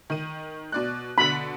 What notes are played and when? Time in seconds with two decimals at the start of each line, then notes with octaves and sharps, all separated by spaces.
0.10 D#3 D#7
0.72 B2 D5 F#6
1.18 B2 D3 B5